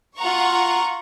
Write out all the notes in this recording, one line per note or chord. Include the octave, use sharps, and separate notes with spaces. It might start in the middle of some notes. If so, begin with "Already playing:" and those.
F4 F#5 A#5 C#6